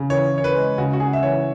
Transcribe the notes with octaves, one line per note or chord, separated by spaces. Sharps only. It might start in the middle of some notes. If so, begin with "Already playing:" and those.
Already playing: C#3
E3 C#5
E3
C#5
B4
G#3
C#3 F#4
F#4
C#3 G#4
E5
E3 C#5